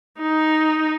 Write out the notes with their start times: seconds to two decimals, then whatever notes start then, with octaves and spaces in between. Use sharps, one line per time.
0.19 D#4